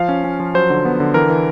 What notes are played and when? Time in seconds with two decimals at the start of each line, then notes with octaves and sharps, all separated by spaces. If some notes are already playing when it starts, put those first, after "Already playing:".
Already playing: F3 F5
0.09 C#4
0.24 C#4
0.40 F3
0.54 F#3 C5
0.70 D3
0.85 B3
1.00 D3
1.14 E3 A#4
1.30 E3